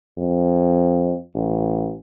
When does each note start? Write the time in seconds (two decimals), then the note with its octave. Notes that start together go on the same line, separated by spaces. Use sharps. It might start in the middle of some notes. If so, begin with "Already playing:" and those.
0.18 F2
1.35 A1